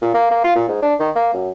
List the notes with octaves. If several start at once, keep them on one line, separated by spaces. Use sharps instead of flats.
A#2
A#3
A#3
F4
A#2
G#2
D4
D#3
A#3
F#2